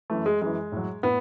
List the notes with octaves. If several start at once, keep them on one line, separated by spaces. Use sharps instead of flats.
F#2 E3 A3
G#3
F#2 E3 G#3
A2 F#3
A2 B3